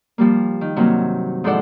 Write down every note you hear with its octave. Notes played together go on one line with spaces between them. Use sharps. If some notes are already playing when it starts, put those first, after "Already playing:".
F3 G3 A#3
D#3
G2 C3 F#3 A#3 C4
G#2 F3 E4 A4 D5 F#5